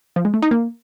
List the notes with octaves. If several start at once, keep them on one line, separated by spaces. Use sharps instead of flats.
F3
G#3
A3
D#4
A#3